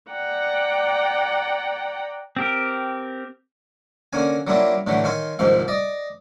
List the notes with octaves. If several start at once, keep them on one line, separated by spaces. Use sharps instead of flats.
D5 F#5 G5 A#5
C4 G4 A#4
D3 A#3 C#4 G#5
F#3 G3 A#3 D4 E4 F4
A2 D3 E3 F#3 A3
D#3 C#5 F5 G#5 C6
C2 G#2 D#3 F3 C4 F5
D5 D#5